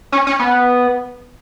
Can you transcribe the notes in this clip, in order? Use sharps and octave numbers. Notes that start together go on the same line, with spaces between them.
C#4
C#4
B3